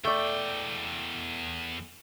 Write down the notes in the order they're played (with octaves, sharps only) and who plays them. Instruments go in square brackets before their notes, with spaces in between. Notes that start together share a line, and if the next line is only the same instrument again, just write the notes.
[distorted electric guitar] E2 G5 [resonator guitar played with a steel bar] A3 D5